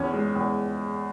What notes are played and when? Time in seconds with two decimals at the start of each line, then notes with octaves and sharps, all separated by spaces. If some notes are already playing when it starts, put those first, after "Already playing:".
Already playing: E2 C#4
0.13 G#3
0.36 E2